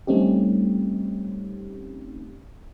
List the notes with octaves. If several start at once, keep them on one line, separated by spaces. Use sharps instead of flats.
G3 A3 C4 C#4 D#4 G4